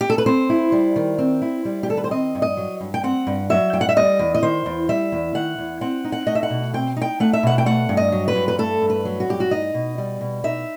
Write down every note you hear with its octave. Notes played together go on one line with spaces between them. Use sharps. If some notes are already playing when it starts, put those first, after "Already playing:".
G4
A4
B4
C4 C5
E4
G3
D#3
C4
E4
G3
G4
D#3 A4
B4
C5
C4 D#5
G2
D#5
F#3
G2
G5
C4 F#5
G2
F#3 E5
G2 G5
F#5
E5
G3 D#5
E2
D#5
D#3 C5
E2
G3 E5
E2
D#3 F#5
E2
C4 F#5
D#4
F#5
A3 D#5
E5
F#5
B2
C4 G5
D#4 G5
A3 F#5
E5
B2 F#5
G5
A3 F#5
G2
D#5
F#3
B4
G2
B4
A3 A4
G2
B4
F#3
F#4
G2 G4
F#4
D#4 D#5
B2
G3
B2
D#4 E5